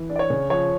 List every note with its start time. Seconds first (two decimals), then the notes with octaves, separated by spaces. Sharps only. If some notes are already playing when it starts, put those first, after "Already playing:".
Already playing: E3
0.10 D4
0.16 D5
0.19 C#5
0.30 C#3
0.50 F3 C#5